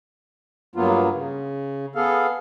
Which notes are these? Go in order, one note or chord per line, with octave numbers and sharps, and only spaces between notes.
G2 F#3 A#3 B3 F4
C#3
B3 G#4 A4 F5